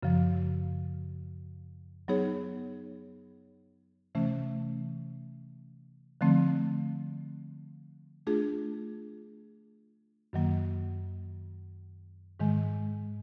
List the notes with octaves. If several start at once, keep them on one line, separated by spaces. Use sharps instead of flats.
F#2 C#3 F3
F#3 B3 D#4 G#4 C#5
C3 E3 A3 C#4
D3 F3 A3 C4
A3 D4 F4 G#4
F#2 D#3 F#3 A#3
G#2 D#3 G#3